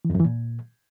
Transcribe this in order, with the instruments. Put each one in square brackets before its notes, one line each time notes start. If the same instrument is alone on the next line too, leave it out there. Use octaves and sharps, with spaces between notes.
[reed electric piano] E3
F2
F#2
E3
A#2